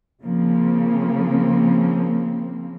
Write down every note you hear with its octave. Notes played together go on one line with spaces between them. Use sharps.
C#3 F3 A#3 C4